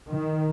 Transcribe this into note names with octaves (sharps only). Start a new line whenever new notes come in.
D#3